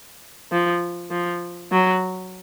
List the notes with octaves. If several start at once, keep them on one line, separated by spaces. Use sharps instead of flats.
F3
F3
F#3